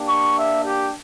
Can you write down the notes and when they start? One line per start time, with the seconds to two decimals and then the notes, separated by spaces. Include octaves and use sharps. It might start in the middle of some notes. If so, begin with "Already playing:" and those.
Already playing: A#3 D4 G4
0.08 C#6
0.37 E5
0.65 G4